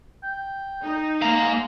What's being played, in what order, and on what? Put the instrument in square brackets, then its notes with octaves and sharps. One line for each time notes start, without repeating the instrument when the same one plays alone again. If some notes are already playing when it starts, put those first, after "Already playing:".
[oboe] G5
[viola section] D#4
[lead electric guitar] G#2 A#5 [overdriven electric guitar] A#3 F5